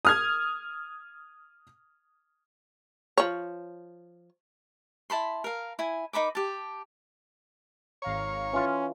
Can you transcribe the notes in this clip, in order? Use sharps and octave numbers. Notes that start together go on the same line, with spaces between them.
D#6 F6 G#6
F3 C#5
E4 A5 B5 C6
A#4 F5
E4 G#5
D#4 A#4 B5 D6
G4 A5
G#1 C#5 F5 A#5
E3 C#4 F4